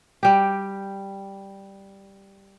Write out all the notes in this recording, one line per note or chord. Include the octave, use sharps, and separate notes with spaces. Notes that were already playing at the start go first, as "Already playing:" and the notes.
G3 G4